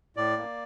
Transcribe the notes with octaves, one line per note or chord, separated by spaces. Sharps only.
A2 D5
A#3